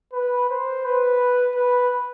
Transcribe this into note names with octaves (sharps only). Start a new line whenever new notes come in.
B4
C5
B4
B4